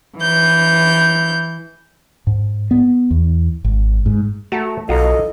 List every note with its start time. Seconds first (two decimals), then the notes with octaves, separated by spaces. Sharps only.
0.17 E3 G6
2.27 G#2
2.71 B3
3.11 E2
3.64 G#1
4.06 G#2
4.52 A3 F#4 A5 A#5
4.89 B1 F4 F#4 A4 D#5 A#5